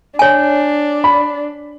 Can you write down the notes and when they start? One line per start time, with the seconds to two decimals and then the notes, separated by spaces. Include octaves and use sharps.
0.19 D4 C#5 G#5
1.04 B5